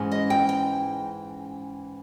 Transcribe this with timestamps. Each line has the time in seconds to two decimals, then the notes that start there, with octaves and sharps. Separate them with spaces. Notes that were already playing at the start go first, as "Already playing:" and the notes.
Already playing: G#2 E3 G#3 C#4
0.12 D#5
0.30 G5
0.49 G5